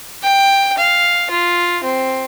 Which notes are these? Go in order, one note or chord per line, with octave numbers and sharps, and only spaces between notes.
G5
F5
F4
C4